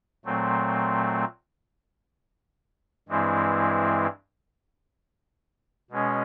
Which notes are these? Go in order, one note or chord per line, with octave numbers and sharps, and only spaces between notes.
A#2 F#3 A3 C4
G2 E3 G#3 C4 E4
B2 G#3 C#4